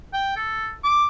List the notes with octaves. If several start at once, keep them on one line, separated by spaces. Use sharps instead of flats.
G5
A4
D6